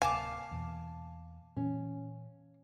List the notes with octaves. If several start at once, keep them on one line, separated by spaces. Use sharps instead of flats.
D1 C3 A#3 F5 G#5 A5 D6
E2 B2
A#2 E3 C#4